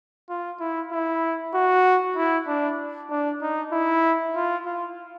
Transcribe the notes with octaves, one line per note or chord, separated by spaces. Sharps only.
F4
E4
E4
F#4
E4
D4
D4
D#4
E4
F4
F4